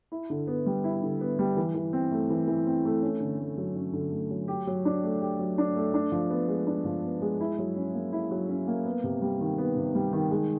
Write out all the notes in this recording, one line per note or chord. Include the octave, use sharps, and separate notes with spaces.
E4
D3
B3
G3
E4
D3
B3
G3
E3
E3
C4
A3
E3
E3
C4
A3
C#4
D3
A3
F#3
C#4
D3
A3
F#3
G4
F#3
D4
A3
G4
F#3
D4
A3
D4
F3
B3
G#3
D4
F3
B3
G#3
E4
F#3
C#4
A#3
E4
F#3
C#4
A#3
B3
C3
G3
D#3
B3
C3
G3
D#3
G#3